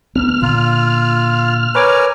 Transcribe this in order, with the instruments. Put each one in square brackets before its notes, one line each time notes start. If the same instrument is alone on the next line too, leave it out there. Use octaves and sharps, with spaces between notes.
[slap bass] D2 B3 [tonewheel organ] F6
[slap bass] A#2 D3 [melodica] F4
[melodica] A#4 G#5 [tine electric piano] B4 C#5 D6